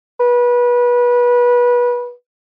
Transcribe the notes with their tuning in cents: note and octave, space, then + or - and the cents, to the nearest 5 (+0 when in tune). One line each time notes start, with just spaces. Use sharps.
B4 -25